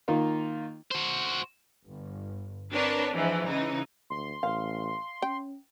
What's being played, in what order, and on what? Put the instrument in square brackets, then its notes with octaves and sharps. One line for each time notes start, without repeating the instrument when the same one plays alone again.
[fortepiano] D#3 A#3 D#4 F4
[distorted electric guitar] F#4 C5
[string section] G1
C4 D4 A#4 B4 C#5
G#2 E3 F3 E4
C#3 E3 D#4
[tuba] D2 [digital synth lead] C6
[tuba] A1 [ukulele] F5
[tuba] C#4 [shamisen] G5